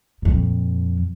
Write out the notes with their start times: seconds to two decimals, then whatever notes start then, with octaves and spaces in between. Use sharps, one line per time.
0.22 F2 A#2